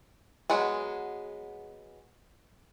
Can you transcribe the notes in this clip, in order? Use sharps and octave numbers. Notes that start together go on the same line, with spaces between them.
F#3 G#3 B3 G#4